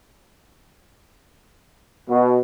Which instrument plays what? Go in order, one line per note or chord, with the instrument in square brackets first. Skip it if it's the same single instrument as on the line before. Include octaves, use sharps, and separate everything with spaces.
[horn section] B2